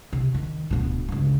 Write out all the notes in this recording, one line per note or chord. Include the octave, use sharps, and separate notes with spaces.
C3
D#3
D1 B2
G1 C#2